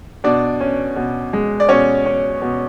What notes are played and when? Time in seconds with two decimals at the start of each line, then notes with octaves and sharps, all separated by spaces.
0.24 B2 D4 D5
0.61 C#4
0.96 B2
1.33 G#3
1.60 D5
1.69 B2 C#4 C#5
2.06 C#4
2.42 B2